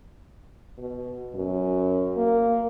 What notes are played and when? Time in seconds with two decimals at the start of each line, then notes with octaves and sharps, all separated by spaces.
0.78 B2
1.35 F#2
2.17 A#3